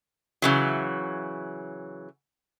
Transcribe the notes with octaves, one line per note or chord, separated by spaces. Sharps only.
C#3 E3 F#3